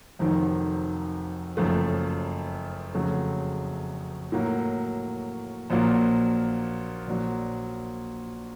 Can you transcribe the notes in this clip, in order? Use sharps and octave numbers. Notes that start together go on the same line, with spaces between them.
F1 F2 D#3 F#3
F#1 F#2 F3 A3
F#1 F2 C#3 F#3 A3
A2 F#3 A#3
A#1 A#2 F#3 A#3
A#1 A#2 F#3